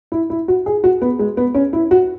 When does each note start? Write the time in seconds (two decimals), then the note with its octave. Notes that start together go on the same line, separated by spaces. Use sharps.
0.12 E4
0.30 E4
0.48 F#4
0.66 G#4
0.84 F#4
1.02 B3
1.19 G#3
1.37 B3
1.54 C#4
1.73 E4
1.91 F#4